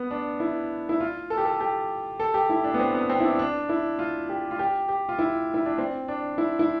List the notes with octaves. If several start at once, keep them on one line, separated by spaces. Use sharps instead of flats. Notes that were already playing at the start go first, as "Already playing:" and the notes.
Already playing: B3
D4
E4
E4
F4
A4
G4
A4
G4
A4
G4
E4
D4
B3
C4
B3
C4
E4
D4
D4
E4
F4
G4
F4
G4
G4
F4
E4
E4
D4
C4
D4
E4
E4